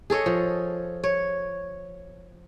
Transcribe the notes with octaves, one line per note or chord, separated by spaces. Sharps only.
G#4 A4 C#5 D#5
F3
C#5